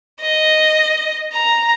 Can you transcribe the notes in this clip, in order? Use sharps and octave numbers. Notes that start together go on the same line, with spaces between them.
D#5
A#5